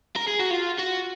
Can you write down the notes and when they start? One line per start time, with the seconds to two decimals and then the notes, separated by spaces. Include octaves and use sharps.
0.16 A#4
0.27 G#4
0.39 F#4
0.50 F4
0.78 F#4